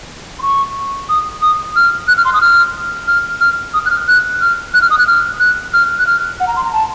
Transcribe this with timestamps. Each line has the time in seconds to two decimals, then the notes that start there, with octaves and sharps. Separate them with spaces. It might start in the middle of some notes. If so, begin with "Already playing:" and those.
0.39 C6
0.42 C#6
1.09 D#6
1.42 D#6
1.76 F6
2.08 F#6
2.17 F6
2.25 C6
2.34 D#6
2.41 F6
3.08 F6
3.41 F6
3.74 D#6
3.86 F#6
3.90 F6
4.08 F#6
4.41 F6
4.74 F#6
4.82 F6
4.90 D#6
4.99 F#6
5.07 F6
5.40 F#6
5.73 F6
5.99 F#6
6.07 F6
6.40 F#5
6.47 A#5
6.56 C6
6.65 A#5
6.73 A5